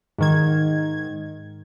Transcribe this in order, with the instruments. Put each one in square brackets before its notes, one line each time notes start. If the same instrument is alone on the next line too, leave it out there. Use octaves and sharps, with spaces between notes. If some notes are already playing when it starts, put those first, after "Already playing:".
[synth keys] G#2 D#3 G#6